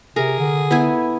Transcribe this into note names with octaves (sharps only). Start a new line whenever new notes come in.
C3 G#4 A#4
D3
B3 E4 G#5